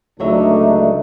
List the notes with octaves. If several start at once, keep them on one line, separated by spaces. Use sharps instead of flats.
C#2 D3 F#3 A3 D4 D#4 E5